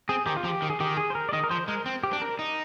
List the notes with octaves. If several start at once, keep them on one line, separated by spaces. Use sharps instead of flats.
C4 G#4
D#3 G4
F4
F3 G4
D#3
G#4
D#3 G4
G#4
C5
A#4
D5
D#3 D#5
A#4
F3 C5
G#3 A#4
C4
G4
D4
A#4
D#4